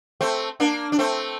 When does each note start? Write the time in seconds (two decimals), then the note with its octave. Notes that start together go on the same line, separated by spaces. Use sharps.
0.21 A3 C4
0.60 A#3 D4
0.92 D4
0.99 A3 C4